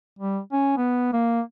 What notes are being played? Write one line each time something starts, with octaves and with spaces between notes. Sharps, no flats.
G3
C#4
B3
A#3